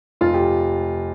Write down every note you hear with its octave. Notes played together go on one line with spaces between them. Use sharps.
F1 F4
G4